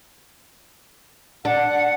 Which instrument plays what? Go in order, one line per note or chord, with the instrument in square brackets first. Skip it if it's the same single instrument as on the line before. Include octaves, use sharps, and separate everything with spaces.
[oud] D4 [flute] F#5